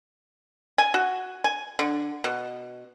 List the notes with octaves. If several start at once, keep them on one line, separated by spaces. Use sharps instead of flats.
G#5
F#4
G#5
D3
B2